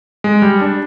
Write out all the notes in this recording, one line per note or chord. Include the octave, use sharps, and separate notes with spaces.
G#3
G3
D4